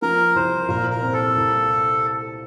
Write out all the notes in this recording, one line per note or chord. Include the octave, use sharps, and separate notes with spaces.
F3 A#4
C2 C5
A#2 A#4
A#4
C4
A4
C2